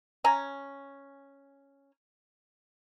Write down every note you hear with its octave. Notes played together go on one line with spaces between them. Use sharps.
C#4 G#5 A#5